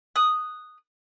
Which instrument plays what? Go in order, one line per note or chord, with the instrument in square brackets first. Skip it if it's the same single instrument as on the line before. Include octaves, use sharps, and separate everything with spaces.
[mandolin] D#6 F#6